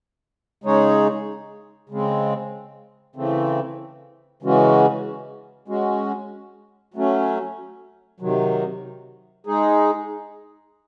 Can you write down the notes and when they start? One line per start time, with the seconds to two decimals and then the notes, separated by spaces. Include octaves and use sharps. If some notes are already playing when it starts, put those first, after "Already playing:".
0.64 C#3 G#3 D#4 G#4 C#5
1.90 C#3 G#3 C4
3.16 C#3 E3 A3 C4
4.43 C#3 E3 G#3 C#4 F#4
5.68 G#3 C#4 F#4
6.94 F#3 A3 C#4
8.20 C3 D#3 F#3
9.47 G#3 D#4 G#4